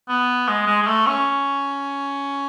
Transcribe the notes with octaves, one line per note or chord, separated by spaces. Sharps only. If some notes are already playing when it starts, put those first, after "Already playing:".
B3
G#3
G#3
G#3
A3
C#4